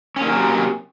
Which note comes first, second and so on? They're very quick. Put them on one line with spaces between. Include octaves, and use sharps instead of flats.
C#4 A#3 D#3 F#3 C3